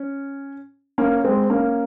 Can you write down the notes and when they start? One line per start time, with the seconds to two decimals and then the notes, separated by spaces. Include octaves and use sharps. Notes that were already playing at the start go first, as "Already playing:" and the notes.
Already playing: C#4
0.98 A#3 C#4
1.24 G#3 C4
1.50 A#3 C#4